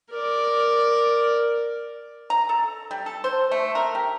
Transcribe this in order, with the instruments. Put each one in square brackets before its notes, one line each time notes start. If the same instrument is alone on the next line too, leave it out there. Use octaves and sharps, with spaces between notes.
[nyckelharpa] A#4 D5
[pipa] A#5
A4
G3
A4
C5
A3
A#4
G4